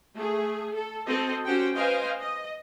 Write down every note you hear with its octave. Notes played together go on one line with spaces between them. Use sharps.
A3 G#4
A4
C4 F#4 A4 C5 D#5
C#4 F#4 G4 C5 F#5 G5
B4 C5 D#5 F5 G5 G#5
D#5